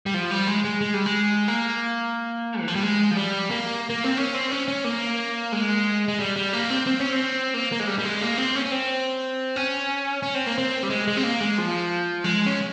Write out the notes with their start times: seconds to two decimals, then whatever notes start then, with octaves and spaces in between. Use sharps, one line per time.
0.06 G3
0.14 F3
0.31 G3
0.47 G#3
0.64 G#3
0.81 G#3
0.94 G3
1.06 G#3
1.48 A#3
2.61 E3
2.68 F3
2.75 G3
2.83 G#3
3.11 F3
3.17 G3
3.50 A#3
3.90 A#3
4.04 C4
4.17 C#4
4.34 C4
4.51 C#4
4.68 C#4
4.84 A#3
5.52 G#3
6.08 G#3
6.20 G3
6.36 G3
6.53 A#3
6.70 C4
6.87 C4
7.00 C#4
7.12 C4
7.54 A#3
7.72 A#3
7.80 G#3
7.87 G3
7.99 G3
8.04 G#3
8.21 A#3
8.38 C4
8.55 C#4
8.66 C#4
8.72 C4
9.56 C#4
10.23 C#4
10.35 C4
10.46 A#3
10.58 C4
10.83 G3
10.90 G#3
11.08 G#3
11.17 C4
11.23 A#3
11.41 G#3
11.58 F3
12.24 G#3
12.46 C#4